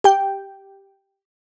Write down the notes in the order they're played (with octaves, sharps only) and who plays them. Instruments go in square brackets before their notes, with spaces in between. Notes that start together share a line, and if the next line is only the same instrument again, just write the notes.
[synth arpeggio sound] G4 G5